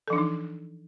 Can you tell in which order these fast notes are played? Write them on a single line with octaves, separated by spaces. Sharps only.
A4 F3 D4 E3 D#4